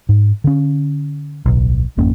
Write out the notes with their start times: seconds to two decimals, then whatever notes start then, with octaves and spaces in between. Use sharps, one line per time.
0.09 G#2
0.44 D3 C#4
1.46 D1 B1
1.97 G#1 F2 A#3 C#4